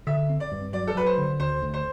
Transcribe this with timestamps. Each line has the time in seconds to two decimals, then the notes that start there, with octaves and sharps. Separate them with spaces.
0.07 D3 E5
0.29 C4
0.40 D5
0.52 G2
0.73 F#3 D5
0.87 A4
0.95 F#3 B4
1.06 C5
1.18 D3
1.40 D2 C5
1.62 D2
1.74 C5